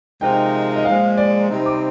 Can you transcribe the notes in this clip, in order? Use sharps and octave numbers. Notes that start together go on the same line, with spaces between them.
C3 F3 G#3 D#4 A#4 G5
D#5
A#2 F3 G#3 F5
D5
C3 G3 C4 D#4
D6